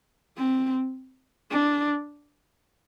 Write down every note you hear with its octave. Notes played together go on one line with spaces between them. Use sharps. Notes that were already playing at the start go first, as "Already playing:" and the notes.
C4
D4